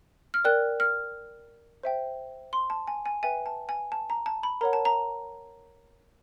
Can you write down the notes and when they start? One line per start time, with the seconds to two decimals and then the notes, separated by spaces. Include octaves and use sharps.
0.34 F6
0.45 A#4 D5 G5 F#6
0.80 F6
1.83 C5 E5 G5
2.53 C6
2.70 A5
2.87 G#5
3.06 G#5
3.23 B4 E5 G5 G#5
3.46 A5
3.69 G#5
3.92 A5
4.10 A#5
4.26 A5
4.43 B5
4.61 A#4 C#5 F#5 A#5
4.73 A5
4.85 A#5